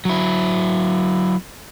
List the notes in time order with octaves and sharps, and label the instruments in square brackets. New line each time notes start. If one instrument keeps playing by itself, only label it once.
[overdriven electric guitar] F#3 E4